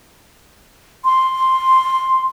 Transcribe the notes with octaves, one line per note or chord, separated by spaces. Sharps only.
C6